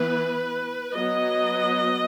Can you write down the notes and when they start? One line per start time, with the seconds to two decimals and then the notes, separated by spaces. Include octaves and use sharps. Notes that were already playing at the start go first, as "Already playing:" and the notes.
Already playing: E3 B3 B4
0.94 F#3 B3 D#5